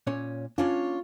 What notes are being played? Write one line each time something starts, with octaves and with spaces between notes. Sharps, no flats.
A#2 C#4 C#5
A#3 C#4 D4 F4 C#5